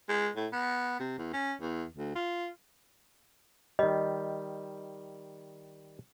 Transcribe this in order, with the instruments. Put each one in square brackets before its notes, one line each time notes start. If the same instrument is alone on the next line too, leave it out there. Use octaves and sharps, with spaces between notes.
[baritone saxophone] G#3
A2
B3
C3
E2
C#4
E2
D2
F4
[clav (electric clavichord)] D#3 G3 [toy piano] D#5